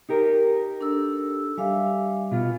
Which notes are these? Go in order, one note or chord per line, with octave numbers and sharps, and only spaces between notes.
D#4 G4 A#4
D4 A4 E6
G3 E5 F5 G#5
B2 F4